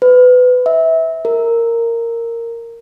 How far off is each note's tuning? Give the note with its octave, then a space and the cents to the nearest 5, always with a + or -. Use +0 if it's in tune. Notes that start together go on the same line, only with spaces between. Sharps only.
B4 +20
E5 -25
A#4 -10